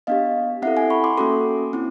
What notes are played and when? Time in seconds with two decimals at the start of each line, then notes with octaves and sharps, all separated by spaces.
0.07 B3 D4 G4 D#5 F5
0.62 C4 E4 A4 E5 F#5
0.77 F#5 G#5
0.90 B5 C#6
1.04 C6 D6
1.17 A#3 C#4 F#4 A4 C6 D6
1.73 C4 E4